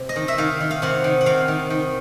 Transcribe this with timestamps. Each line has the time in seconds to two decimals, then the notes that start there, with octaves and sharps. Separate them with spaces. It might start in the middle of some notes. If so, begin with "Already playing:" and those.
Already playing: C3
0.09 D#5
0.16 D#3
0.28 E5
0.38 D#3 F5
0.60 D#3
0.71 F5
0.82 C3 F#5
1.04 D#3
1.21 F#5
1.26 C3 F5
1.48 D#3
1.70 D#3